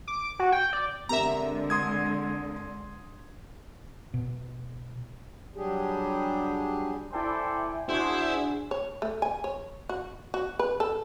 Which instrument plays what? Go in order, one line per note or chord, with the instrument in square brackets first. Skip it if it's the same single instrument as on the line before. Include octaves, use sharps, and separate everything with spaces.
[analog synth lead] D6
F#4
G5
D5
[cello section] D3 G#3 [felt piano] C4 G4 A#4 [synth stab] E5 A#5
[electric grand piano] C6 D#6 G#6
[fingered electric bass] B2
[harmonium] F#3 G3 D4 G4 G#4
[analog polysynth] E4 G5 G#5 [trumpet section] A4 C5 D5
[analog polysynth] D4 F#4 G#4 [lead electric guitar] E4 [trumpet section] C5
[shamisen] C#5
A3
G#5
C#5
F#4
F#4
B4
A4